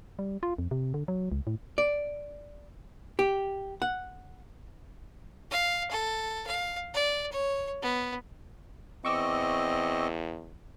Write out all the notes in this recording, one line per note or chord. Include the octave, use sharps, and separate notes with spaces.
G3
F4
F2
C3
D3
F#3
C#2
A2
D5
G4
F#5
F5
A4
F5
D5
C#5
B3
E2 C4 D#5 C#6 D6 E6